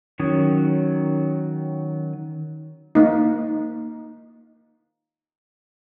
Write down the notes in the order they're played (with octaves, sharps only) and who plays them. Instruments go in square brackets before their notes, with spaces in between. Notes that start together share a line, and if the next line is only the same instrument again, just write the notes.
[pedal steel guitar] D#3 F#3 C#4 C#5 D#6
[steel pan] A#3 D#4